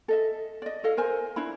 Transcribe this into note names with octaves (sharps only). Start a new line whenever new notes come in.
A4 D#5 E5
D5 D#5
E4 A4 D#5 F5
A#4 C5 G#5
D4 E4 B5